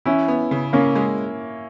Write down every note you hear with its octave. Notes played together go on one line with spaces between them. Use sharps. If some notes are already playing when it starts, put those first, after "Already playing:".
E3 C#4 E4
B3
C#3
C#3 A#3 C#4
G#3